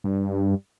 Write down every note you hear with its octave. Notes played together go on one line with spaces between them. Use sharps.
G2